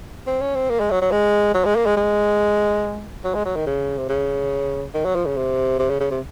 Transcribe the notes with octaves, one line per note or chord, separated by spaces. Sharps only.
C4
C#4
C4
A#3
G#3
F#3
F#3
G#3
F#3
G#3
A#3
G#3
G#3
F#3
G#3
F#3
D#3
C#3
C3
C#3
D#3
F#3
F3
C#3
C3
C3
C#3
C#3
C3